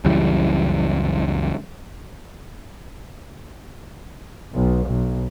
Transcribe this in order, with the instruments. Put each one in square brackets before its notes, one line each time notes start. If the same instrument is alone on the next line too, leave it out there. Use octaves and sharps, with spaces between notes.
[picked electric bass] C#2 F#2 E3 G3
[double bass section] B1
B1